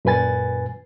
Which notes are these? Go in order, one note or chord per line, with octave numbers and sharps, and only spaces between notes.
F#2 A#2 B4 G#5 A6